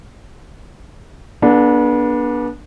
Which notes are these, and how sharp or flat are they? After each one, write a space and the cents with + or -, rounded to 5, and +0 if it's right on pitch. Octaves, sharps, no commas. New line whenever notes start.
B3 -35 D4 +0 G#4 +45